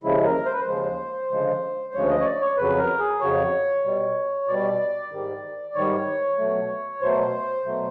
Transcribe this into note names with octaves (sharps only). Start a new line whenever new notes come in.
D#2 C#3 F3 G#3 E4
A#4
C5
B4
C5
D#2 C#3 F3 G#3
D2 C#3 F3 G#3
D2 C#3 F3 G#3 C#5
D#5
C#5
D5
C#5
F2 C#3 F#3 B4
A#4
G#4
F2 C#3 F#3 C#5
B2 G3
B2 G3 D5
G#2 D#3 G3
G#2 D#3 G3 C#5
B2 F#3 A3
B2 F#3 A3 C5
B2 F#3 A3